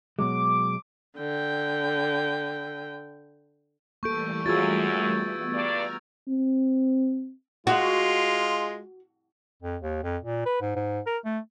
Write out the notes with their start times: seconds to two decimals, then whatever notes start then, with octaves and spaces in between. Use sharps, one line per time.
0.19 B2 F#3 G#3 D6
1.18 D3 G5
4.03 E3 G3 A3 A#3 A4 C#6 G6 D7
4.46 F#2 F4 F#4 G#4 E6 G#6 A6
5.16 B3
5.54 G2 D5 A#5 F6 G#6
6.28 C4
7.67 G#3 F4 F#4
9.63 F2
9.82 D#2
10.04 F2
10.23 A#2
10.46 B4
10.61 G#2
10.76 G#2
11.07 A#4
11.25 A3